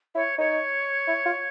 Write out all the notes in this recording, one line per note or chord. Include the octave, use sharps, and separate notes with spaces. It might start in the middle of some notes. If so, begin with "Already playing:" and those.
E4 C#5
D#4 C#5
E4
F4